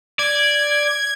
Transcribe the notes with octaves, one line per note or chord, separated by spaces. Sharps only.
D5 G#6